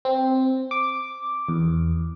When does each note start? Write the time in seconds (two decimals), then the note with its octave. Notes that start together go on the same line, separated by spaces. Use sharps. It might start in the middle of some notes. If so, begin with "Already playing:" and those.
0.05 C4
0.71 D6
1.48 E2